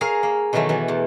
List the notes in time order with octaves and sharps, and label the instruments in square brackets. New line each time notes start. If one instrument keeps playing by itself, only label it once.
[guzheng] G#4 A#4 C#5 F5
A#3
B2 D#3 E3 F#3 A3
B2 E3 B3
E2